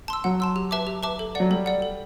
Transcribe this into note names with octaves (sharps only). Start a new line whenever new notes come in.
A5 C6 E6
F#3 F#5
A5 C6 E6
G4
B4 E5 A5 D6
G4
B4 E5 A5 D6
A4
F#3 D5 F#5
G3 A4
D5 F#5
A4